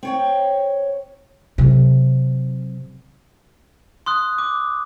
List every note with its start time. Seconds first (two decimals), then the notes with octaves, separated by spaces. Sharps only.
0.03 C4 C#5 G5
1.58 C3 F#3
4.06 C6 D#6 F#6
4.38 D6